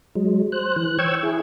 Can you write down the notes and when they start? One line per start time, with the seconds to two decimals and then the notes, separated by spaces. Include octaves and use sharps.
0.15 F#3 G#3
0.52 C5 F#6
0.76 E3 F#6
0.99 C5 C#5 G5 C#6 E6 G#6
1.23 E4 G#4